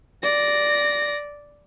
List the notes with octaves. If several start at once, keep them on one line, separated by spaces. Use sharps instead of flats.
D5 A#6